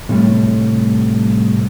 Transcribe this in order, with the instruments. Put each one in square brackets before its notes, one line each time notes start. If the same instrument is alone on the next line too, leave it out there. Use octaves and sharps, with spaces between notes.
[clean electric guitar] A2 C3 G3 A3